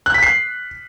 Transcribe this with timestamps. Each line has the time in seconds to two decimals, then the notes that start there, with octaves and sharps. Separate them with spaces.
0.06 F#6
0.14 B6
0.23 C7